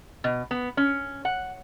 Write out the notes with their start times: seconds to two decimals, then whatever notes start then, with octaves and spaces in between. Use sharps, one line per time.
0.24 B2
0.51 B3
0.77 C#4
1.25 F#5